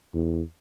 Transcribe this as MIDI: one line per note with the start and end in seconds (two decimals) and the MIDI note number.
0.14 0.42 40